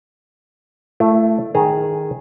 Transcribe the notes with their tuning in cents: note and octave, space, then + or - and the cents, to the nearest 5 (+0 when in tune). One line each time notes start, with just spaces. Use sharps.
A3 +0 E4 +35
D#3 +0 G#4 +0 A#5 -30